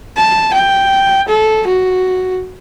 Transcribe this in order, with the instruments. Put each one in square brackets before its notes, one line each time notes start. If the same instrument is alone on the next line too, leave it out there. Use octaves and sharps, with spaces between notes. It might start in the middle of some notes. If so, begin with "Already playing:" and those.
[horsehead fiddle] A5
G5
A4
F#4